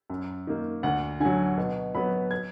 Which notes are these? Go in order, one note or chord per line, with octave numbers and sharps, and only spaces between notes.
F#2
D#3 A#3
D2 F#5
D3 F#3 G#5
B2
F#3 B3 B5
G#6